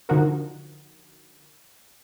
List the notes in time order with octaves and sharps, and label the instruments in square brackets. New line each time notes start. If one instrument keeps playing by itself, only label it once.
[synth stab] D3 F3 D#4 F#4 A#4